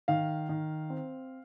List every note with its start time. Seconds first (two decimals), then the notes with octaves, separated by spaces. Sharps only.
0.08 D#3 F5
0.49 D#3
0.90 C4